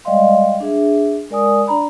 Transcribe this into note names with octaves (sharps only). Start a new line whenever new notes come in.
G3 G#3 D5 D#5 F5 C6
D4 G#4 E5
G#3 A#4 D5 G#5 D#6
D4 D5 A#5 B5